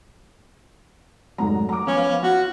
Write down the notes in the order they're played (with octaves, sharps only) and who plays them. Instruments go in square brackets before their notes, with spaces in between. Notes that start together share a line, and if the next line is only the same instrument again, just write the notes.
[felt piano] F1 G#2 A#5 [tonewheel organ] F#3
[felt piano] A#5 D6
[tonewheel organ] F3 B3 F5 [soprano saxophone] C#4 [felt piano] D6
[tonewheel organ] F4 [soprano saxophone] F#4